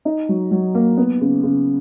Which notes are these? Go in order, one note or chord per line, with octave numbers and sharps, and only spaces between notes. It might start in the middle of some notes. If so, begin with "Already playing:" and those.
D#4
F#3
F#3
A#3
B3
C#3
C#3